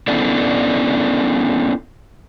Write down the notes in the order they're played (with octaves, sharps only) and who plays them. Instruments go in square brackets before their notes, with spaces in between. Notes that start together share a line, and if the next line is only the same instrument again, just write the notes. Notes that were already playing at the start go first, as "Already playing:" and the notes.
[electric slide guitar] B3 C#4 D4 E4 A4 D5